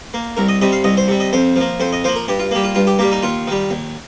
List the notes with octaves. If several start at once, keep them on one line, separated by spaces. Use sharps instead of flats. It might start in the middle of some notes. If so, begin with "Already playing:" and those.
A#3
C2 A#4
D#5
C3 G3 D#5
F5
C2 D#5
C5
C3 G3
D#5
F2 C5
F3 A#3
F2 C5
D#5
F3 A#3 C5
A#4
G2 G4
F4
G3 A#3 G4
F4
G2 F4
G4
G3 A#3 G4
D#4
D#2 F4
D#3 G3
D#2